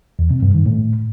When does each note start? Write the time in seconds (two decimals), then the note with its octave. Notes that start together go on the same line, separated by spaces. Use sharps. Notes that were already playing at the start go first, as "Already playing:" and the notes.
0.19 E2
0.31 C3
0.42 G2
0.54 D#3
0.66 A2